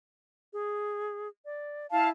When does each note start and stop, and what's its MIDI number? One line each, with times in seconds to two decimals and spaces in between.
0.53 1.28 68
1.45 1.87 74
1.92 2.10 64
1.92 2.08 77
1.92 2.08 81